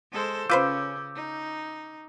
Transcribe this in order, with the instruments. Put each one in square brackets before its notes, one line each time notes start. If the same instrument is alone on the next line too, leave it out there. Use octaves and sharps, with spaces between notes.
[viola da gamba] G#3 A4 C5
[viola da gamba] C#3 C#4 [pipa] F4 B4 C5 [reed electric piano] D6 E6 G6
[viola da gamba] D#4